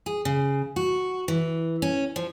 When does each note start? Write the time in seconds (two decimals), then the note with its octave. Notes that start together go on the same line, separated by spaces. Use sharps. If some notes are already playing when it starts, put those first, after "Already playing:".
0.06 G#4
0.25 C#3
0.76 F#4
1.28 E3
1.82 C#4
2.16 F3